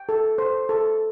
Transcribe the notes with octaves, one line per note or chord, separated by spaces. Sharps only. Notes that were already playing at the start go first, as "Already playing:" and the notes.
Already playing: G5
A4
C5
A4